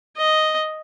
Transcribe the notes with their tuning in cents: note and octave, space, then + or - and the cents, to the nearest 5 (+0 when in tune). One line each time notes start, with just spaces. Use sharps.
D#5 +0